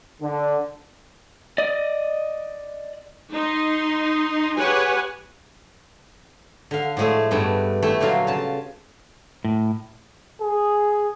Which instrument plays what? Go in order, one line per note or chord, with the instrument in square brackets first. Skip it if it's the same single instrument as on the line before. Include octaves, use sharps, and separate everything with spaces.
[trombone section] D3
[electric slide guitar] D5 D#5
[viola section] D#4 C6
G4 G#4 B4 C#5 F#5 G#5
[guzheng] D3 F5
A2 F3 G#3 A3 G#4
G2 A3 B3
A3 E4 A4 E5 G5
A#2 D3 F#3 F4 F5
C#3 F5 A5
[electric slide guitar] A2
[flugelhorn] G#4